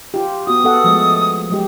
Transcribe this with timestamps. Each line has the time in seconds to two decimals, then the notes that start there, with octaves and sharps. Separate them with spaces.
0.14 F4 G4
0.47 B3 F#4 D#6
0.64 B3 A4 F#5
0.84 F3 G#3 A3
1.50 F#3 G#3 G4